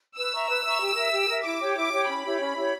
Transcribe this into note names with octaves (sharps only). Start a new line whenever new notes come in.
B4 E6
E5 A#5 C#6
B4 E6
E5 A#5 C#6
G4
A#4 E5
G4
A#4 E5
E4 D6
G4 C#5 G5
E4 D6
G4 C#5 G5
C#4 B5
E4 G4 C#5
C#4
E4 G4 C#5